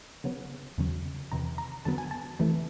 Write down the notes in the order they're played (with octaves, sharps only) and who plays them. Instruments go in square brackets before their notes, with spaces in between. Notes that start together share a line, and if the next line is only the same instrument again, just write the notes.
[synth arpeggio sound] C#3 F#3 B3
E2 C#3 F#3
E2 C3 D#3 A#5
A#5
F2 D3 F#3 B3 A5
G#5
A5
F2 C3 E3 A3